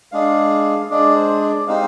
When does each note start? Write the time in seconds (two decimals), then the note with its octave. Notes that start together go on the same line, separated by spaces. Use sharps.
0.12 G#3 D4 G#4 F5
0.90 G#3 D4 G#4 D5
1.16 C5
1.41 D5
1.67 G#3 C4 D#4 G4 F5